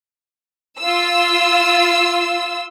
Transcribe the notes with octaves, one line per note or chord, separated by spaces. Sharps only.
F4 E6